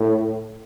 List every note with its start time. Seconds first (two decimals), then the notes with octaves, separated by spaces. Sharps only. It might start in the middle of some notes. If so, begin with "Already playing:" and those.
Already playing: A2